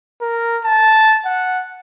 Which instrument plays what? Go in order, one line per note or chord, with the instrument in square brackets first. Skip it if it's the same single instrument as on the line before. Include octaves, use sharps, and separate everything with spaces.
[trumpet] A#4
A5
F#5